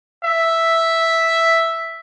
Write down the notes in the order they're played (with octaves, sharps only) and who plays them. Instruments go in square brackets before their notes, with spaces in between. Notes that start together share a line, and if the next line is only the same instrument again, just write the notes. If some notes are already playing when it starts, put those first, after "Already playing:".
[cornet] E5